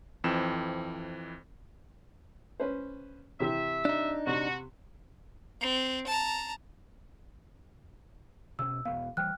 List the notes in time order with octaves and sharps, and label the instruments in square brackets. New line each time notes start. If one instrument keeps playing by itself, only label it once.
[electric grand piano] F2 E3 C4 E7
[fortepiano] C#4 B4 C5
[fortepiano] C3 E3 G4 [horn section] E5
[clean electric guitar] D4 D#4
[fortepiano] C3 [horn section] F#4
[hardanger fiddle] C4
A5 A#5
[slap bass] B2 C#4 [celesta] E6
[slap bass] E1 E2 B3 [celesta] F5
[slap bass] E3 G3 [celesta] G5 F6 F#6